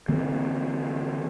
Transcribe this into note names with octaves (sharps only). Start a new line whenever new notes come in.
D3 E3 A#3 C4